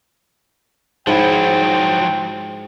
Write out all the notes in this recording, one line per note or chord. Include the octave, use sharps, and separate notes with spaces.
G#2 F3 F#3 E4 G5